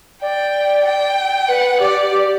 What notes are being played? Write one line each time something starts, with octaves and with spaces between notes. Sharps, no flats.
D5 G5
G5
B4 F#5
G4 D5
G4